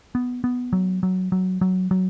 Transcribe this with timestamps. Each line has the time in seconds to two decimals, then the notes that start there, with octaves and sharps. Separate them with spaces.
0.15 B3
0.44 B3
0.73 F#3
1.03 F#3
1.32 F#3
1.61 F#3
1.91 F#3